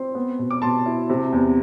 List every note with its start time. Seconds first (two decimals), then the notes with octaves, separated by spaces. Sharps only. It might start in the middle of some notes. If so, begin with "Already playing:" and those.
Already playing: C4 C6
0.15 B3
0.39 B2
0.51 D6
0.62 B2 A5 C6
0.86 E4
1.10 C3
1.32 E2